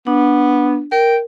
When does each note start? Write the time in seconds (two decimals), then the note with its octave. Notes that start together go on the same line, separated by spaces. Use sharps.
0.07 B3 D4
0.92 A#4 G5